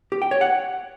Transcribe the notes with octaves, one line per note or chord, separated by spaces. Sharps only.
G4
G5
C#5
F#5